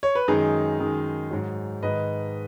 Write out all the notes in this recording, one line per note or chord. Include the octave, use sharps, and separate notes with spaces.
C#5
B4
F#2 D#3 G#3 D#4 G#4
F#2 D#3 G#3
G#2 F#3
G#2 D#3 G#3 B4 D#5